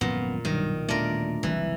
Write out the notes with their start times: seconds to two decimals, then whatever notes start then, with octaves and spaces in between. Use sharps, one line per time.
0.01 G#1 F#2 A#2 F3 B3
0.45 B1 G2 A#2 D#3 G3
0.88 D#1 B2 D3 A3 D4 F4 A#4 D5
1.43 F#1 C2 E3